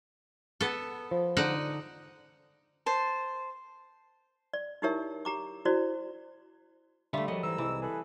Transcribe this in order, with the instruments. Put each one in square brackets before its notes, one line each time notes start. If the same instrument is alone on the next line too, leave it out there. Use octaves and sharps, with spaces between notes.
[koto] B3 A4
[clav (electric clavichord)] F3
[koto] D3 D#4 F#5
[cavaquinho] C5 A5
[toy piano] D5
D#4 E4 G4 A#4 C#5 E5
G4 A#5 D6
E4 F#4 C5 D5
[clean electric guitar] D3 F4 [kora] G3 A3 [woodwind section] E5
[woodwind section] F#2 [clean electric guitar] F3 F#3 [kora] D#5
[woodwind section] G#2 A#5 E6 [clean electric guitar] E3
[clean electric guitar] C2 [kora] E3
[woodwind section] G#4 A4 B4